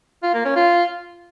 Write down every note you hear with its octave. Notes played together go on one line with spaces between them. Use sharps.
F4
A#3
C#4
F4